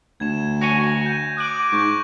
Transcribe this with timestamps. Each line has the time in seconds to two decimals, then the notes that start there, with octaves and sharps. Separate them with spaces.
0.20 D2 G#6 E7
0.61 F#4 C#5 G#5 A#6
1.06 G6
1.38 D6 F#6 D#7 F#7
1.72 G#2 C#6 G6